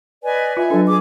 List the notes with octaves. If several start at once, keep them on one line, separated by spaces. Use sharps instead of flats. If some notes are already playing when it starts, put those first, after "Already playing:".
B4 D5 D#5 G#5
F4 E5 G#5
F#3 D4 A4
G#4 D6